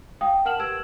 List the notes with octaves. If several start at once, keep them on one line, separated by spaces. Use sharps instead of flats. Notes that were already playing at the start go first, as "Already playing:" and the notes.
F5 G5 D#6
A#4 F#5 A5 F6 E7 F#7
G4 B4 E6 G#6 D7 E7